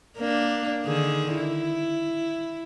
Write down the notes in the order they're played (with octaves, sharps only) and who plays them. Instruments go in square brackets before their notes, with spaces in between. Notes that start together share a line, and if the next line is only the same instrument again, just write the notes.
[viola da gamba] A#3 D4
D3 D#3 G#4
E4